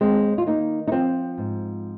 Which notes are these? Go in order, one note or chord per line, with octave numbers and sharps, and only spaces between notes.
D#2 G#3 C4
F4
D#3 A#3 D#4
D#4
F3 C4 F4
G#2